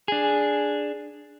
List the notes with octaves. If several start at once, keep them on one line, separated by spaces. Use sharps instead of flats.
D4 G#4